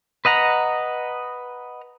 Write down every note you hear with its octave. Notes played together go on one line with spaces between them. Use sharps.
B4 D#5 F#5 A#5